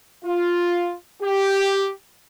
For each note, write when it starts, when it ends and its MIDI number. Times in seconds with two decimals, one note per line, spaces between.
0.25 0.94 65
1.22 1.90 67